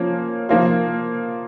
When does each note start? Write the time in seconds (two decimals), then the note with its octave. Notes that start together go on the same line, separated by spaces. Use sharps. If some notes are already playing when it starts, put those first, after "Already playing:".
Already playing: F3 A#3 C#4
0.49 F3 A#3 F4